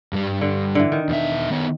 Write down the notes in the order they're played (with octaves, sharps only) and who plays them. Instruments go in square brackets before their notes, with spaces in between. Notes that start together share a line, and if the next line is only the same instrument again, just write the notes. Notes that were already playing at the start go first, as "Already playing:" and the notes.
[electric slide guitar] G2 G3
[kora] D3
D3 E3
D#3
[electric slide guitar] E2 B2 E5
D#3 B3 C#5